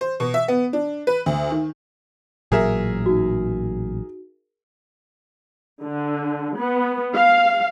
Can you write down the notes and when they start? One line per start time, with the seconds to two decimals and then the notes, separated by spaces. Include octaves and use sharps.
0.01 C5
0.20 B2
0.34 E5
0.48 B3
0.73 D4
1.07 B4
1.26 D2
1.50 D#3
2.52 A1 A#2 F#3 G#4 A#4 E5
3.06 D#4 F#4
5.83 D3
6.57 B3
7.14 F5